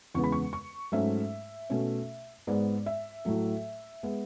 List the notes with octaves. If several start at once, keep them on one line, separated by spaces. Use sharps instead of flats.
E2 C#3 G#3 B3 C#6
B5
C#6
C#6
G#2 F#3 A3 C#4 E5
B2 A3 C#4
G#2 G#3 B3 D5
E5
A2 F#3 A3
G#3 B3